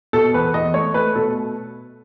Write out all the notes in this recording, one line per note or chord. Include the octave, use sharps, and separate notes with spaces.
B2 A4
E2 B4
E2 D#5
A3 C#5
A3 B4
B2 A4